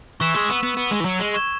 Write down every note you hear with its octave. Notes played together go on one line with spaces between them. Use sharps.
E3 C#6 E6 B6 E7
G#3
B3
B3
B3
G#3
E3
F#3
G#3
C#6 G#6 E7